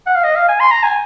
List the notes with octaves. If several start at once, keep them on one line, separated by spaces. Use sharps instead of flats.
F#5
F5
D#5
F5
G#5
C6
A#5
G#5